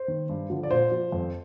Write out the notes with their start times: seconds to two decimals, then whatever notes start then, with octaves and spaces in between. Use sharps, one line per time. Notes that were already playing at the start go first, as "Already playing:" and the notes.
Already playing: C5
0.08 D#3
0.29 G2
0.50 D3 F3
0.63 D5
0.71 A#2 C5
0.91 F3
1.12 F2